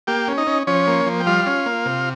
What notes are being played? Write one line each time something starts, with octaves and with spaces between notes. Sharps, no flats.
A#3 G4 G5
C#4
D#4 D#5
C#4
F3 C#4 C#5
A#3
F3
G5
G3 F4 F5
C#4
A#3
C3